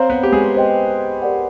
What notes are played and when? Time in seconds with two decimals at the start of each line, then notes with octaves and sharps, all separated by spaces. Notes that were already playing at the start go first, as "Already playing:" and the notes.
Already playing: C4 C5 C#5 F5 A#5
0.10 B3 B4
0.23 G4
0.32 G#3 G#4
0.55 C5 D#5 G5
1.22 G4 A#4 D5 F#5